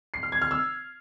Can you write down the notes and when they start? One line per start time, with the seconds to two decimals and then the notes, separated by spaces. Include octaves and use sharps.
0.14 C7
0.23 F6
0.32 G#6
0.42 F6
0.51 E6